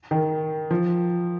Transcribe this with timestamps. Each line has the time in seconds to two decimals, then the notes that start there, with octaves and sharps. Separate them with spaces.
0.11 D#3
0.71 F3